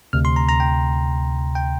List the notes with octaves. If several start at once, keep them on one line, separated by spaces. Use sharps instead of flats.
D2 C3 F6
C6
A#5
A#5
G5
G5